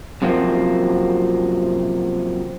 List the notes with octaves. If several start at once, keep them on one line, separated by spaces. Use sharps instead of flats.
F#2 C3 F3 A#3 C4